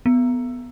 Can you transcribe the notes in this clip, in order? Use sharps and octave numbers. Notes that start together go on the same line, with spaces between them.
B3